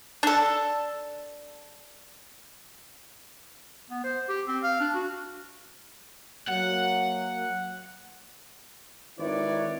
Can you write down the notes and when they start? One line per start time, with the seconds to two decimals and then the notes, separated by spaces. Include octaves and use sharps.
0.23 D4 A4
3.90 B3
4.04 C5
4.29 G4
4.47 C4
4.63 F5
4.80 D4
4.94 F#4
6.48 F#3 A#3 F#5
9.19 G#1 D#3 E4 B4 C#5 D5